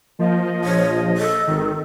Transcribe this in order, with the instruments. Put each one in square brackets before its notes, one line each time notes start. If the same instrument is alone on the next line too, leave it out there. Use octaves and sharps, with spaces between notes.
[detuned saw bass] F3 [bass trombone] A#3 [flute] D#5
[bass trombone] A#1 [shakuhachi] C#5
[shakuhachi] A4
[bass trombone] G#1 [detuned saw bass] D#3